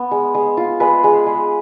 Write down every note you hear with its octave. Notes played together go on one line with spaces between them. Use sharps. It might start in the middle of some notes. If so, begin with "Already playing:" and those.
Already playing: B3
G#3
G#3
F4
G#3 B4
G#3
G#3